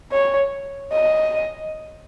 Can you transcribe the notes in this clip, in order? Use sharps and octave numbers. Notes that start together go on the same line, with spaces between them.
C#5
D#5